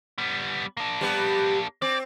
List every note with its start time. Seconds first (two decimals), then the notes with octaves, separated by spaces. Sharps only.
0.18 G3 B3
0.77 A#3 D4
1.01 G3 B3
1.82 C4 D5